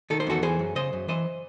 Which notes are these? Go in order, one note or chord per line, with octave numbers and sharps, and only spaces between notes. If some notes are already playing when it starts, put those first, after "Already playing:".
D#3 A4
C5
E2 F#4 A4
E3 G#4 C5
F#2
C#3 C5 D#5
F#2
E3 C5 D#5